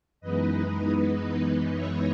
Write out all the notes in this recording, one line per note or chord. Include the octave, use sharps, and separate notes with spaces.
F#2 E3 G#3 B3 D#4 B4 D#5
B4 D#5
C#5 E5